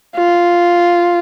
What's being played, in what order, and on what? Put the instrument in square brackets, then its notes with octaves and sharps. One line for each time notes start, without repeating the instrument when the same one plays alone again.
[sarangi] F4